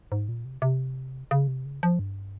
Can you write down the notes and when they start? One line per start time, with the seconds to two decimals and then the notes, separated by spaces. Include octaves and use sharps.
0.12 G#2
0.29 A#2
0.45 C3
0.62 C3
1.31 C#3
1.48 C3
1.65 C#3
1.83 F3
1.99 G2